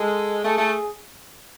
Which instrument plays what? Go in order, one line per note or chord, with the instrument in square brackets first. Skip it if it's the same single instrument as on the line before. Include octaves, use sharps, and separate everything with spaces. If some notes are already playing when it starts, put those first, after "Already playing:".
Already playing: [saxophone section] G#3 [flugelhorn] A4
[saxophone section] A3 [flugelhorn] G#4
[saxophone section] A3